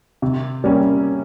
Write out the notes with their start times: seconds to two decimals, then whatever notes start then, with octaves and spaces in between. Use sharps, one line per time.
0.22 C3
0.64 G3 A#3 C#4